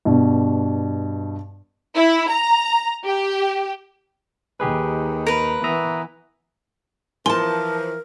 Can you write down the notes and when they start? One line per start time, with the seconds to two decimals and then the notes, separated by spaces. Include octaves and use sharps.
0.05 G2 B2
1.96 E4
2.30 A#5
3.05 G4
4.60 D#2 D#3 G4 G#4 B4
5.27 A#4 B4 A#5
5.64 E3 B3 E5 A#5 D#6
7.26 E3 F3 A#4 G#5 A5 C6